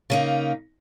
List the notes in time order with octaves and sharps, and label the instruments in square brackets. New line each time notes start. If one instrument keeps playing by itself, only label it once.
[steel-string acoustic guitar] C#3 A#3 D#4